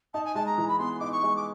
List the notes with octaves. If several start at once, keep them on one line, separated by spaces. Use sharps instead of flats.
D#4 A5
G#5
G#3 A5
A#5
E3
B5
B3 C6
D#4 D6
C#6
G#3
D6